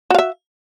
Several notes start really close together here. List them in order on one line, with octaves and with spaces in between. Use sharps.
F#4 F5 E5